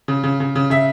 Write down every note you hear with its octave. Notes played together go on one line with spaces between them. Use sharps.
C#3
C#3
C#3
C#3
C#3 E5